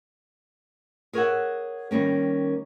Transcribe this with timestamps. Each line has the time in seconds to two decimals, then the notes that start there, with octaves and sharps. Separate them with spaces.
1.13 G#4 A#4 C#5 D5 E5 F#5
1.91 D#3 G3 A#3 C#4